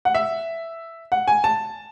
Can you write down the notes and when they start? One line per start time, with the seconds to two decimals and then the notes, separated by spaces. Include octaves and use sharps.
0.05 F#5
0.14 E5
1.12 F#5
1.28 G#5
1.44 A5